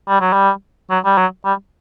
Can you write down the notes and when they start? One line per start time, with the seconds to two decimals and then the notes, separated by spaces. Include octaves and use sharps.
0.08 G3
0.21 F#3
0.33 G3
0.90 F#3
1.05 G3
1.18 F#3
1.45 G3